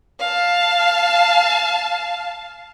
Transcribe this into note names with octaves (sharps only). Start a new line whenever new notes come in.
F5 A5